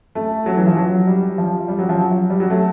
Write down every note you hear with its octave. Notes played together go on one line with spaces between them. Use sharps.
A3
F#3
E3
F3
F#3
G3
F3
G3
F#3
F3
F#3
G3
F#3
A3